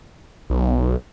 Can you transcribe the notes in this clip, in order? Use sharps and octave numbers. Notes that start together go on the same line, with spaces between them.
B1